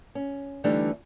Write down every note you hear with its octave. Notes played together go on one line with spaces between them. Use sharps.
C#4
D3 E3 G3 A3 D4 D#4